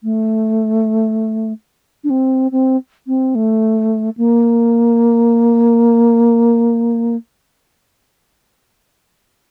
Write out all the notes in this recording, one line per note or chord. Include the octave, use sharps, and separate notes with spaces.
A3
D4
C4
C4
C4
A3
A#3